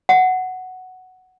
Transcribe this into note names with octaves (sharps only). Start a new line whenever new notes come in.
F#5